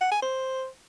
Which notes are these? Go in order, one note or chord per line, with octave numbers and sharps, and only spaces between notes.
F#5
G#5
C5